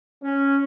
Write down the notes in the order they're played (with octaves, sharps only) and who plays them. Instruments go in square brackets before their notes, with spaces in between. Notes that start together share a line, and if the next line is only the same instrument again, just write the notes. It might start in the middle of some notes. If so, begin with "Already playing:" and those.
[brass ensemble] C#4